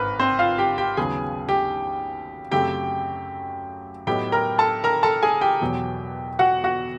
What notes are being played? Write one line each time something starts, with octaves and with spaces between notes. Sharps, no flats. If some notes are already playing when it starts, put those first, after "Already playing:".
Already playing: G#1 G2 A#4 B4
C4 C5
F4 F5
G4 G5
G4 G5
D#2 C#3 F#3 B3 G#4 G#5
G4 G5
F#2 C#3 F#3 A3 C4 G4 G5
A2 F#3 B3 D#4 G4 G5
A#4 A#5
A4 A5
A#4 A#5
A4 A5
G#4 G#5
G4 G5
E2 B2 F#3
F#4 F#5
F#4 F#5